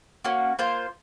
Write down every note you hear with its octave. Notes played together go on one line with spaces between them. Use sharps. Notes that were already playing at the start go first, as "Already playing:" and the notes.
A#3 C#4 F#4
A#3 F4 C5